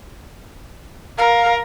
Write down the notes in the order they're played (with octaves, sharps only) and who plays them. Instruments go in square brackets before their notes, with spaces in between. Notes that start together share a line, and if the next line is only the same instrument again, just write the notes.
[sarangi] A#4 [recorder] F5